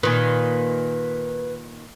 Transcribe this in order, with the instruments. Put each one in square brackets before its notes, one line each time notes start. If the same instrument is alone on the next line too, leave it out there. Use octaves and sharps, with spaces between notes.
[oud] A#2 D#3 [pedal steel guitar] B4 G#5